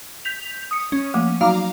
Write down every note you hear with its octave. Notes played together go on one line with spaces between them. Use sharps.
G6 B6 F7
D#6 C#7
C#4
F3 A3 A#3
F#3 D#4 F#4 F5 A#5 D6